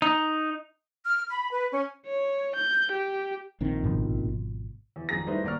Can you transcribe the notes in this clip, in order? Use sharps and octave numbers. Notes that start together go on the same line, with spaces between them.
D#4
F6
B5
B4
C#4
C#5
G6
G4
A#1 D#3 C4
G#1 B2 F3
E2
G#1 F2 G#4 A#5 A#6
G3 A3 D#4 E4 B4 C5
G#1 A#3 D5 A#5 C#6 F6